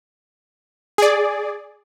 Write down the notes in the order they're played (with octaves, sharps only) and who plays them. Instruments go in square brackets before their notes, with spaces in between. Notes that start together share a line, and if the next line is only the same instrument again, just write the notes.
[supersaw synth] G#4 D5